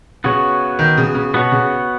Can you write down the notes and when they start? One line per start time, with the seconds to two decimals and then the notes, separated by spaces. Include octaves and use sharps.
0.24 C#3 B3 F#4 C#5
0.79 D#3
0.97 C#3
1.15 C#3
1.34 B2 B3 F#4 C#5
1.52 C#3